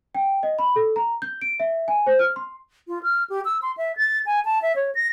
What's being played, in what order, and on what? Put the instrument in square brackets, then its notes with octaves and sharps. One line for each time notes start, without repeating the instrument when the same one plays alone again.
[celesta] G5
D#5
B5
A4
A#5
G6
D7
E5
G#5
C5
F6
C6
[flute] F4
F6
G4
E6
C6
E5
A6
G#5
A5
E5
C#5
A#6